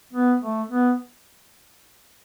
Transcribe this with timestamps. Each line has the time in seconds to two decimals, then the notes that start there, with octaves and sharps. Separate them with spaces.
0.13 B3
0.41 A3
0.70 B3